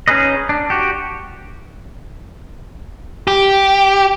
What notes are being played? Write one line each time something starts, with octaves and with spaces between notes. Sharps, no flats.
C#4 D#4 G#4 B4 D#5
D4
F#4 G4
G4